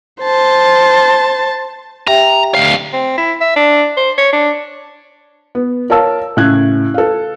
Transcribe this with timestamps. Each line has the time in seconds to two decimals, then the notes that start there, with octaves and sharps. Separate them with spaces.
0.21 C5 A5
2.08 G4 E5 G5 A#5
2.55 D2 F5
2.93 C4
3.18 E4
3.41 E5
3.56 D4
3.97 C5
4.18 C#5
4.33 D4
5.55 B3
5.90 A#4 C#5 F5 A5 E6
6.37 A2 C#3 F#6 G#6
6.94 A4 F5